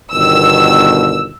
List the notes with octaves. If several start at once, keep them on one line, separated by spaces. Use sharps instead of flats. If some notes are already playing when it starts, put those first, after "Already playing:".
G1 B2 D#3 E6